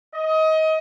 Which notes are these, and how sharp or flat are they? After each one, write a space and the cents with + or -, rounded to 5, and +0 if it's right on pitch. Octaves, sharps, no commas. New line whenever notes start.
D#5 +25